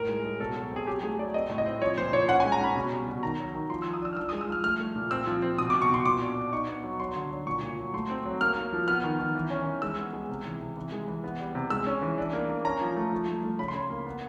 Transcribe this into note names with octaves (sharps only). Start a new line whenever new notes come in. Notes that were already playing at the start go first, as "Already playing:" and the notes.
Already playing: A2 A#4
G#3
G#3
B2 A4
F#3
C4 G#4
F#3 G4
A3 G#4
F#3 D5
C4 D#5
A2
D#5
C4
F3 C#5
A#2 C5
A#2 C#5
C#4 F#5
G#5
G#3
A#5
C#4 B5
B2
G3
B2
D#3 A#5
F#3
D#3
F3 C6
E6
F3
D#6
D4 E6
F6
F3 E6
D#6
G#3
E6
F3 F6
A3 F6
A3
A#2
C4 E6
F3
C4
B2 D#6
D6
B2
C#6
B2 C6
A#2 D6
D4
D4
D#4 C#6
B3
F#3
F#3 C6
D3
F#3
A#2 C#6
A#2
F#3
A3 C6
C4
F#3
A#3 F6
A#3
F3
B3 F6
D#3
D#3
E3
C#4
E3
G#3 E6
B3
G#3
C3
E3
C3
E3
G#3
E3
B3
G3
C3
G#3 E6
C#4
E3
D4
A#3
A#3
C#4 A#5
F3
A3
F3
A3
A3
C#3 B5
C6
C#3 B5
A#3
B3